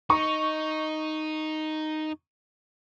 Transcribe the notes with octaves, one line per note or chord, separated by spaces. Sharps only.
D#4 C#6